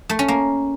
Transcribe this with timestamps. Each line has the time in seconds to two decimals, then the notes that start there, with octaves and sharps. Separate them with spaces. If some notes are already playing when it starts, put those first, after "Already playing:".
0.09 A3
0.19 C#4
0.28 A#3